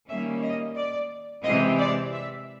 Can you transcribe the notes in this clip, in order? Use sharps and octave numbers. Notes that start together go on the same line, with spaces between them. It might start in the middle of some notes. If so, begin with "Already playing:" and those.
D#3 G3 A#3 C#4 E5
D#5
D5
C3 E3 G#3 C4 D#5
D5
E5